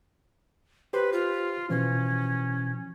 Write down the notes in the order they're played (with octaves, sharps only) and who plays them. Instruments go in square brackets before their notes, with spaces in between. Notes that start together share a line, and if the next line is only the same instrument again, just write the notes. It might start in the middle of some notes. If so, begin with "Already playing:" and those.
[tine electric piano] G4 C5 C6 [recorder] B4
[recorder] F4
[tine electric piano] B2 E3 F3 [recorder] C#4